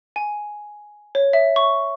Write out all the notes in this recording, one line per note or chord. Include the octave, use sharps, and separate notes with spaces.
G#5
C#5
E5
C#6